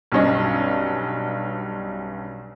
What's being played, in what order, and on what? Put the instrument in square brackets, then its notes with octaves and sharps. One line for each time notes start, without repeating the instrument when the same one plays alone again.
[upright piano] B1 G2 C#4 D#5